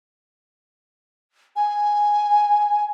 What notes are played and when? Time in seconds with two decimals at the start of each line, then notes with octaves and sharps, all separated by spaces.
1.56 G#5